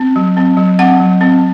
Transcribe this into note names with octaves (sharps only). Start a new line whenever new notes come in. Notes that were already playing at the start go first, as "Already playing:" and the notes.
Already playing: C4
F#3
C4
F#3
C4 F#5
F#3
C4